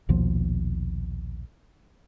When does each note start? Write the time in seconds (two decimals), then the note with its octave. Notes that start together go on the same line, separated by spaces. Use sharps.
0.09 A#1 D#2 B2 F3